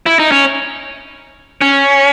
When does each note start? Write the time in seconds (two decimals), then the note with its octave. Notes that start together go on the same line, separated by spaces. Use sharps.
0.06 E4
0.19 D#4
0.32 C#4
1.61 C#4